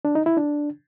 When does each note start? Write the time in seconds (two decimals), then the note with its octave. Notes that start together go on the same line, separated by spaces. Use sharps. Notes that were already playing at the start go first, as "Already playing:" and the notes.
0.05 D4
0.15 D#4
0.26 E4
0.37 D4